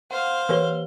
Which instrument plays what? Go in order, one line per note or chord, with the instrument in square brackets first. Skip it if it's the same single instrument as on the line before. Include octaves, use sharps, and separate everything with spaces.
[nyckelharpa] C5 F5 [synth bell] F#5
[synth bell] E3 G4 G7 [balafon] A#4 B4 C#5